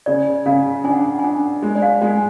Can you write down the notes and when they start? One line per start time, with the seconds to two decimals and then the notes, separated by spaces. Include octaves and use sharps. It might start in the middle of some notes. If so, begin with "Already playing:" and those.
0.06 C#3 D5
0.46 C#3 F5
0.84 D4 G#5
0.93 F#5
1.00 G#5
1.19 G#5
1.24 D4 F#5
1.62 G#3
1.75 D5
1.82 F5
2.01 G#3 G#5